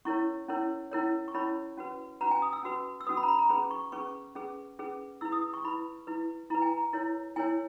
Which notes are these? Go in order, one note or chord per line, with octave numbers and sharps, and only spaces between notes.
C#4 E4 A#4 C#5 C#6
C#4 E4 A#4 C#5
C#4 E4 A#4 C#5
C#6
C#4 E4 A#4 C#5 B5
C#4 F#4 B4
C#4 F#4 B4 A#5
G#5
D#6
E6
C#4 F#4 B4
E6
C#4 F#4 B4 D#6
B5
A#5
B5
A#5
C#4 G#4 B4 B5
C#6
C#4 G#4 B4 C#6
C#4 G#4 B4
C#4 G#4 B4
E4 B4 E6
D#6
C#6
E4 B4 B5
E4 B4
E4 B4 A#5
G#5
A#5
E4 A#4 C#5
E4 A#4 C#5 G#5